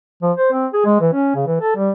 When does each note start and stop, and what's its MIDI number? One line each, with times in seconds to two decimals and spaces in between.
0.22 0.32 53
0.37 0.50 72
0.52 0.67 60
0.73 0.81 68
0.85 0.97 56
1.01 1.09 52
1.13 1.30 61
1.35 1.45 49
1.47 1.58 52
1.61 1.75 69
1.76 1.91 55